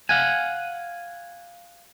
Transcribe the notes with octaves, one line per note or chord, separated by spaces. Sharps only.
F5 F#5 G#5